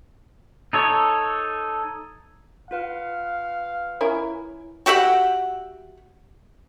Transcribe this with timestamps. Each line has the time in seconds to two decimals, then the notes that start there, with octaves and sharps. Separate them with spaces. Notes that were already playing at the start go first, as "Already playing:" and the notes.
0.73 D#4 A4 C#5
2.71 F4 B4 F5 F#5
4.01 C#4 E4 A#4
4.86 F#4 G4 E5 F#5